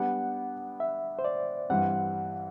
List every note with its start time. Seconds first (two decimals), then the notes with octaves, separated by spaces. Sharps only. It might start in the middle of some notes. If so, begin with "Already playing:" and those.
Already playing: G3 B3 D4 G4 F#5
0.80 E5
1.19 C5
1.25 D5
1.69 G2 E3 G3 C4 F#5